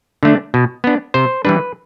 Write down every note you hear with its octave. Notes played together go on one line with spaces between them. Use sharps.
D3 A3 D4
B2
B3 D4
C3 C5
E3 G3 D4 B4